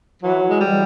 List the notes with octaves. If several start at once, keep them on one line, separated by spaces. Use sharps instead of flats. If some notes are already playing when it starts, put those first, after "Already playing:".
E3 F#3
E3
G#3
E3 G3